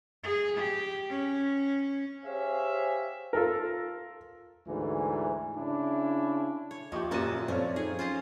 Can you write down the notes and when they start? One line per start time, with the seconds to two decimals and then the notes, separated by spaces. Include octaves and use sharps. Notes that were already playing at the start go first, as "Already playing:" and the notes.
0.23 G#4
0.58 G4
1.10 C#4
2.25 G4 G#4 C5 C#5 E5 F5
3.33 F4 A4 A#4
4.67 D2 G#2 E3
5.56 C#3 D4 E4
6.71 C#5
6.92 D#2 F3 F4 G4 D#5 E5 C#6
7.11 F#2 A#2 A#3 F#4 A5 D#7
7.48 F#2 F3 A3 C4 F4 C#5 D5
7.76 D#4 G#4
7.99 C#4 F4 C5 D#5